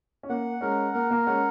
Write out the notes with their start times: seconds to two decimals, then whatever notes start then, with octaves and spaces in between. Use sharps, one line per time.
0.23 C#4
0.29 A#3 F#5
0.61 G#3 C#4 A#4
0.94 A#3 A#4
1.11 A#3
1.26 G#3 C#4 F#5